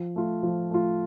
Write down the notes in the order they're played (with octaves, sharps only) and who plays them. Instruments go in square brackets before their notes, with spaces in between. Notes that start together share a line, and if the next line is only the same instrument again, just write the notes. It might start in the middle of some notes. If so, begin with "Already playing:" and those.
Already playing: [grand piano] F3
A3 F4
F3
A3 F4